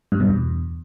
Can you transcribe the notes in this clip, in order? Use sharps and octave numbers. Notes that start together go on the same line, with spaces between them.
G2
B2
E2